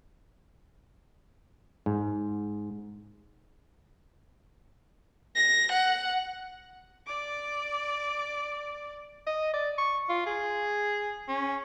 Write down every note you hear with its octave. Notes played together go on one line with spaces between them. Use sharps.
G#2
A#6
F#5
D5 D6
D#5
D5
C#6
F4
G#4
C#4